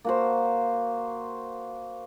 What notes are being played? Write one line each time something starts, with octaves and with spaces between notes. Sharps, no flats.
A#3 F#4 C5